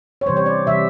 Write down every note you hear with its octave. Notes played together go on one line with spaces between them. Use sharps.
C#5
C3 E3 G3 C5
C#5
D5
C3 E3 G3 E5